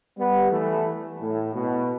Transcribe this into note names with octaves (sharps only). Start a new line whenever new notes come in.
G3 B3
E3 A3
A2
B2